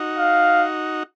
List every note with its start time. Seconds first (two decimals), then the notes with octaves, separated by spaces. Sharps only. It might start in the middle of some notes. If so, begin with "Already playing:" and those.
Already playing: D#4 F#4
0.19 F5